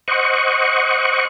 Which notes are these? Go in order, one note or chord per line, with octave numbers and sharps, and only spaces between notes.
C5 D#5 F#5 C#6